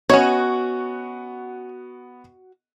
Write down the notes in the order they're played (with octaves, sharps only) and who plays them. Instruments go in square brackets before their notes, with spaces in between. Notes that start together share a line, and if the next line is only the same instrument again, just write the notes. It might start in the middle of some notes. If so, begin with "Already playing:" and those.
[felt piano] B3 D#5 F#5 [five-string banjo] C#4 C#5 [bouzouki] F#4